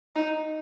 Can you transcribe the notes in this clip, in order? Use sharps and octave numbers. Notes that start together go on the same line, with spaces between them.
D#4